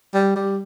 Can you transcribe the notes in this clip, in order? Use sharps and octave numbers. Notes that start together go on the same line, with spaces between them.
G3
G3